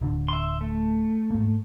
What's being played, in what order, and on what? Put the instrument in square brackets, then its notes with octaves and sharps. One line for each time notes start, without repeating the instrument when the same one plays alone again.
[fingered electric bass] D1 D3
[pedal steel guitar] E5 C6
A3
[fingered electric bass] G#2 A#3